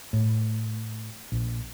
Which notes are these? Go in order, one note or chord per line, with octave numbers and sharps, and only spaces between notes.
A2
A#1